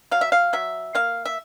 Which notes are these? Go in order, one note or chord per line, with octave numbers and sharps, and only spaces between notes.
F#3 F5
E5
F5
F#3 E5
A#3 F5
E5